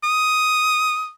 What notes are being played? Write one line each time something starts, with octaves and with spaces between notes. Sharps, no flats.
D#6